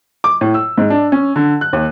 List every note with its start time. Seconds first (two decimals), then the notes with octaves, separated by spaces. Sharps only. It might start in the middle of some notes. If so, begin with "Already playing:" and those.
0.24 D6
0.41 A2
0.54 E6
0.78 G#2
0.90 D4
1.12 C#4
1.36 D3
1.61 F#6
1.73 D#2